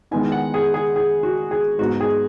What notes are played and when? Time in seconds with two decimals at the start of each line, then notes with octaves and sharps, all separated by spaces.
0.11 D#3 G#3 B3 E4 G#5
0.32 F#5
0.54 G#4
0.74 G#4
0.96 G#4
1.23 F#4
1.51 G#4
1.79 G#2 F#3 B3 D#4 F#4
2.00 G#4